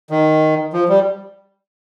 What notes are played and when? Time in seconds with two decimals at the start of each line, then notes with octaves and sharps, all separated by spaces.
0.10 D#3
0.73 F3
0.89 G3